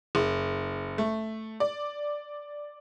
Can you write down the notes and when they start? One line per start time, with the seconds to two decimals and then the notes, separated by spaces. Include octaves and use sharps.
0.15 F#1
0.98 A3
1.60 D5